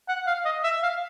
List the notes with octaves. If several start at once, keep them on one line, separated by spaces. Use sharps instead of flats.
F#5
F5
D#5
E5
F5